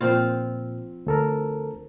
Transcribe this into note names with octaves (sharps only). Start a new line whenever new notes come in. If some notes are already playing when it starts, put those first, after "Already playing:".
A#2 F3 C4 F4
D2 A4 A#4